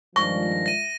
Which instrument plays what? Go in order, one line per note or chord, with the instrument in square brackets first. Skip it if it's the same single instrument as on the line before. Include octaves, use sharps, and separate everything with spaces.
[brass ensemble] G2 D#3 F3 [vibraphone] G#3 F4 D5 [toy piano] C#6 [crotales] A#6
[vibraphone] E5 [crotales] A#6 D#7